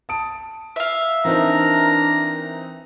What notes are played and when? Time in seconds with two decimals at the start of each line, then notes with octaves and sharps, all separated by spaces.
0.09 A5 D#6 D7
0.76 E5 F5
1.25 E3 C4 D4 D#4 A#4 A#5